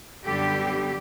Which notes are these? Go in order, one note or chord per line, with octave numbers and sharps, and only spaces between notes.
F#2 D3 G3 B3 G4